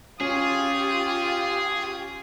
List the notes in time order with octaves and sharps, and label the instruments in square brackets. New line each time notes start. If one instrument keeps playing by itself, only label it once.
[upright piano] C#4 [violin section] F4 G4 [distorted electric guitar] G#4 [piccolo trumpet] D#6